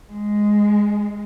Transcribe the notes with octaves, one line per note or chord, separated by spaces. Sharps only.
G#3